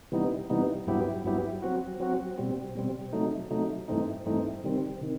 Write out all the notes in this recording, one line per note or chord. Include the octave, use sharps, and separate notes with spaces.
C3 E3 G3 B3 D#4
C3 E3 G3 B3 D#4
G2 F#3 B3 E4 G4
G2 F#3 B3 E4 G4
F#3 C4 F#4
F#3 C4 F#4
B2 G3 C4
B2 G3 C4
C3 F#3 A3 D#4
C3 F#3 A3 D#4
G2 E3 A3 C4 D#4
G2 E3 A3 C4 D#4
C3 D#3 G3 C4
C3 D#3